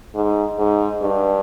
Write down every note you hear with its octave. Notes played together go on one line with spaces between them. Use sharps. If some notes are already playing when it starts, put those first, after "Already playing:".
G#2
G#2
G2